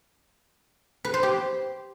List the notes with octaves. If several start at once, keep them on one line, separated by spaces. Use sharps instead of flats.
B4
C5
G4